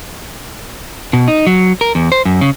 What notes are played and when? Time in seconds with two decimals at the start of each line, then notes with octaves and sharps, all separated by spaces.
1.13 B2
1.28 D#4
1.47 F#3
1.81 A#4
1.95 E2
2.12 C5
2.25 F#2
2.41 C#3